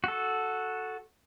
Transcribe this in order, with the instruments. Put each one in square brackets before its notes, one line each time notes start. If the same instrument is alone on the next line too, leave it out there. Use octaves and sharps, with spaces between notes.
[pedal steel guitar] F#4 A4